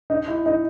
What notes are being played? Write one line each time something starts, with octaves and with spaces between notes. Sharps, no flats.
D#4
E4
D#4